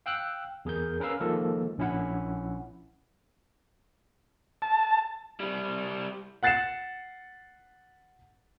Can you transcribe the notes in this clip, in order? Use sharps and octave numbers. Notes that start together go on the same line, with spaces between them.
F5 G5 E6 F#6
E2 G#4 A#4 G6
C#4 A#4 B4 F5 E6
D#3 F3 G#3 A#3 A4
A#1 C#4 E4 F#5
A5
G3 E4
F#5 F#6 A6 C7 C#7 E7